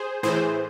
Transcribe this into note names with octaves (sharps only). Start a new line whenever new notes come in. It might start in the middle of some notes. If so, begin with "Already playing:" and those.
Already playing: G#4 C5
A2 E3 G#4 C5